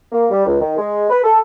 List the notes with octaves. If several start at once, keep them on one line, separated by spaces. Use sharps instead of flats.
A#3
G3
C#2
D#3
G#3
B4
A4